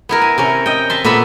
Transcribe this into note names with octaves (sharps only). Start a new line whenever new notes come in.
B3 E4 A#4
G#5
C3 C#4 A#4
D#5 G5
E5 A5 C6
A#2 B3 A4 E5 B5